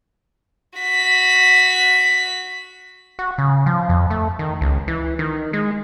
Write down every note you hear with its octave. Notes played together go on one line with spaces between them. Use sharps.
F#4 B6
F#4
C#3
F3
F2
A3
D#3
C#2
E3
D#3
G#3